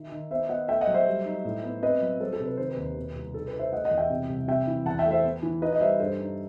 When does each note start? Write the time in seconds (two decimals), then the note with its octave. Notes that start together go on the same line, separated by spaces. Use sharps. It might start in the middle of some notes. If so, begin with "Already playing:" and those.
Already playing: D#3 E5
0.12 D#3
0.31 B3 C5 E5
0.49 B3 D#5 F#5
0.68 A3 E5 G5
0.81 D#5 F#5
0.87 F#3
0.94 C5 E5
1.07 G3
1.25 D#4
1.45 A2
1.64 B3
1.83 C4 B4 D#5
2.01 F#3
2.20 F#3 A4 C5
2.33 A4
2.40 C3
2.46 B4
2.57 D#3 C5
2.68 B4
2.77 D#2
2.97 B2
3.16 C2
3.34 D#4 A4
3.48 B4
3.53 D#4
3.59 C5 E5
3.72 A3 D#5 F#5
3.85 D#5 F#5
3.91 E2
3.97 E5 G5
4.10 C3
4.29 C2
4.48 C3 E5 G5
4.67 E3
4.86 E2 F#5 A5
4.99 E5 G5
5.05 A3
5.11 C5 E5
5.24 B3
5.43 E3
5.62 D#4 B4 D#5
5.73 D#5
5.81 G3 C5 E5
6.00 G2 A4 C5
6.19 D#4